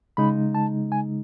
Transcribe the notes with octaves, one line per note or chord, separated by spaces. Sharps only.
C#3 G#3 D#4 B5
A5
G#5